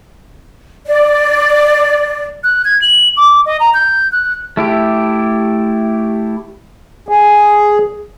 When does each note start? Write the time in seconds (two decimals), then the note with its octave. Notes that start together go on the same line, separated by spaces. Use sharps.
0.87 D5
2.44 F#6
2.65 G#6
2.82 F#7
3.17 D6
3.46 D#5
3.60 A#5
3.74 G6
4.12 F#6
4.57 A3 E4 G4
7.09 G#4